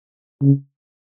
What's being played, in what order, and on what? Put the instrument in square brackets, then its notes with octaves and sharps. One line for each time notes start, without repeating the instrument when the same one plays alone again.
[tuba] C#3